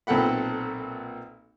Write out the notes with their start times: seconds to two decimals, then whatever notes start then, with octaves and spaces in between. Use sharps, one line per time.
0.07 B1 A#2 C4 A4 F#5 B5